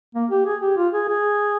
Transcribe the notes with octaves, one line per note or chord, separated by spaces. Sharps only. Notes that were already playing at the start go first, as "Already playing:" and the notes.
A#3
G4
G#4
G4
F4
G#4
G#4